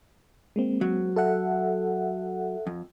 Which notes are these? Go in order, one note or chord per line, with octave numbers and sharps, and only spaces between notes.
G#3 A#3 C4
F#3
A4 E5 F#5
F2